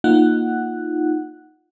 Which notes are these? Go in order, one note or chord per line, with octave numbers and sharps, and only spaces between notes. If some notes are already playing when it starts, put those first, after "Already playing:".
A#3 D#4 F4 F#5 F#6